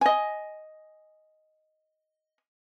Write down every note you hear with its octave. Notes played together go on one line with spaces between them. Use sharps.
D#5 G#5